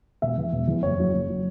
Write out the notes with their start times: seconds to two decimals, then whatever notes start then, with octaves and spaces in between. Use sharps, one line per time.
0.22 E1 E5
0.37 E2 E3 B3
0.52 E1
0.67 E2 E3 B3
0.83 F#1 C#5
0.99 F#2 F#3
1.13 F#1
1.30 F#3